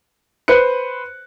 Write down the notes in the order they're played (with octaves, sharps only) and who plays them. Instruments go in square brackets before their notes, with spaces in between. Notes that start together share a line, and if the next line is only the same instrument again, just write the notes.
[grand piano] B4 C5 F#6 C#7